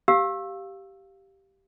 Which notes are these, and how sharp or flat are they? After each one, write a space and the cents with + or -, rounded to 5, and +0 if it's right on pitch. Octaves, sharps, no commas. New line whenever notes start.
G4 -10 F5 +5 E6 +0